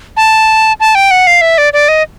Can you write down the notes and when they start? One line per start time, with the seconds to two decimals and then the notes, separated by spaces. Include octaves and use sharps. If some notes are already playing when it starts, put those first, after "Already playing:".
0.17 A5
0.80 A5
0.95 G5
1.11 F#5
1.27 F5
1.41 E5
1.58 D5
1.73 D5
1.88 D#5